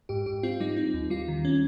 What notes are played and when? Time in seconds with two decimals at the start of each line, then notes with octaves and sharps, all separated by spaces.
0.09 G#2 G4
0.26 G#2 G4
0.43 C4 F4
0.60 G3 D#4
0.76 C4 D#4
0.94 D#2
1.10 G3 F4
1.28 D#3
1.45 C#4